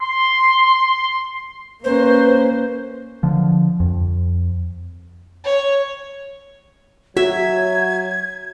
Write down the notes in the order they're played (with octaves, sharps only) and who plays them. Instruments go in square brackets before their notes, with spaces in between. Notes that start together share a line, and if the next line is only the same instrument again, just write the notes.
[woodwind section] C6
[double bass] A#3 C#4 [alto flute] B4 [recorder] C5
[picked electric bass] D3 F3
F2
[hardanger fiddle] C#5
[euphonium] F#3 [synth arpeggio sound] F#4 [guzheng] E5 [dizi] G#6